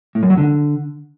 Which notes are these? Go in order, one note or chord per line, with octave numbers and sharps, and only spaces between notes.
A2
F#2
F#3
D3